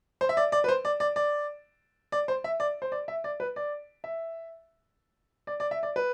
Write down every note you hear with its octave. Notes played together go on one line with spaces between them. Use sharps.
C5
E5
D5
D5
B4
C5
D5
D5
D5
D5
C5
E5
D5
C5
D5
E5
D5
B4
D5
E5
D5
D5
E5
D5
B4